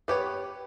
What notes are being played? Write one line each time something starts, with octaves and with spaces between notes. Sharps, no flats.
B3 G4 B4 C#5